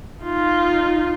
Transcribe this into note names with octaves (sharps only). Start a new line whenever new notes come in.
D#4 F4